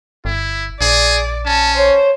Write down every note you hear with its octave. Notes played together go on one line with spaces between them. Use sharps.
G1 E4
A#1 G#4 D5
C#4 A5
C5 C#5